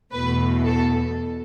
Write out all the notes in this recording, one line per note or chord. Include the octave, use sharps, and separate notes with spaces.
E2 B2 A3 B4
A4